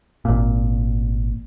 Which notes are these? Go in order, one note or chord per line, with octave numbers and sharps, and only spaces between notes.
G#1 A#2